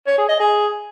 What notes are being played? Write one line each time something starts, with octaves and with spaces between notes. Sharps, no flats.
C#5
G#4
D#5
G#4